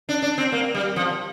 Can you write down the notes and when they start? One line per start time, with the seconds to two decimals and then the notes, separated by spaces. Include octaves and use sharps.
0.09 D4
0.22 D4
0.38 C4
0.52 A#3
0.74 G3
0.96 F3